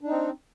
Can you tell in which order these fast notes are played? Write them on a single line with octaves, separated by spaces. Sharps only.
D4 D#4 C4